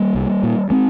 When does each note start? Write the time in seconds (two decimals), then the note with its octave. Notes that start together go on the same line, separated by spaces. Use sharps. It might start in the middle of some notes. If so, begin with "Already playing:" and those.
Already playing: G3 A#3
0.15 C2
0.43 A#2
0.70 G#3 C4